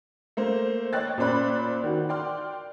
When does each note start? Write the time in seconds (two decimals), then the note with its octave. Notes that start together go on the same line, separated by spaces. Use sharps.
0.37 A3 A#3 C5
0.93 C#5 D#5 G5 F#6 A6
1.18 A#2 C#4 C5 D5 B5 F#6
1.84 D#3 F#4
2.09 D5 G5 C6 F6